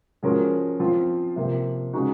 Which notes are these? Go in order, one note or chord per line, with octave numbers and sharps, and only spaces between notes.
F3 G#3 C#4 F#4 A#4
F3 C4 F4
C3 F3 A#3
C#3 G#3 D#4 F#4